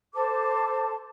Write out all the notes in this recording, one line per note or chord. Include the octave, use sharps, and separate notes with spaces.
A4 C5 A5 D6